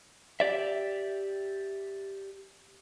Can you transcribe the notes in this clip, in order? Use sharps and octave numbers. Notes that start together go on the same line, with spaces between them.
G4 D5 E5